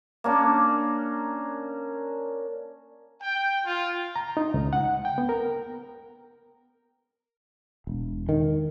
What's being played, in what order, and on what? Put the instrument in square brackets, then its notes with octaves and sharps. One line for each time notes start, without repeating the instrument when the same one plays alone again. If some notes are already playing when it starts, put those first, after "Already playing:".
[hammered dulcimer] A#3 C#4 D4
[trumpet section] G5
F4
[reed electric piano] A#5
D#4
C#2
F#5
G5
B3
A#4
[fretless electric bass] E1
D#3